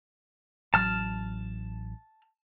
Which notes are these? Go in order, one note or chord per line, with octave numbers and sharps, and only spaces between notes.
A1 F#3 A5 F6